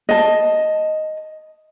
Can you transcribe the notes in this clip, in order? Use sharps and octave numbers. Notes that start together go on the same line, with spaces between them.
D#5 A5